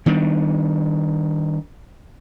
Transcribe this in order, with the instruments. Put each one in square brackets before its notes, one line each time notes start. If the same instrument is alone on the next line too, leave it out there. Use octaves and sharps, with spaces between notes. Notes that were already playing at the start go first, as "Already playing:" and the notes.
[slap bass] D#3 G3 B3 D4